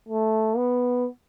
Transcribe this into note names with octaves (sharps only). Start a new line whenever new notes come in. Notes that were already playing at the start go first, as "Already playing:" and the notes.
A3
B3